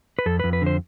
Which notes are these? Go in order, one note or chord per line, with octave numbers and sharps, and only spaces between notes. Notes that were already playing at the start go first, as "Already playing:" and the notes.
B4
F2 A4
F2 B4
B4
D3 C5